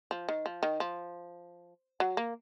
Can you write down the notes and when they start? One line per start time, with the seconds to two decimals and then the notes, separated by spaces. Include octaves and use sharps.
0.11 F3
0.29 D#3
0.46 F3
0.63 D#3
0.80 F3
2.00 F#3
2.17 A#3